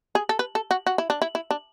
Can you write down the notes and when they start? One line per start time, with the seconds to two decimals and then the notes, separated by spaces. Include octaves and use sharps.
0.15 G#4
0.29 A4
0.39 B4
0.55 A4
0.71 F#4
0.87 F#4
0.98 E4
1.10 D4
1.22 E4
1.35 E4
1.51 D4